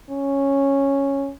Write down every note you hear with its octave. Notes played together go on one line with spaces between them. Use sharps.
C#4